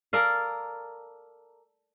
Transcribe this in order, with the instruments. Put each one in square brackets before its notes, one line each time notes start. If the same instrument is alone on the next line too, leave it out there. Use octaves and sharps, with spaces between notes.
[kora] A4 A#4 D5 F5